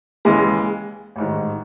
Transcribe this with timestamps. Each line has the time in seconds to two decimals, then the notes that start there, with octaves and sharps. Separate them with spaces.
0.25 D#2 C#3 E3 G#3
1.16 A1 G#2 D#3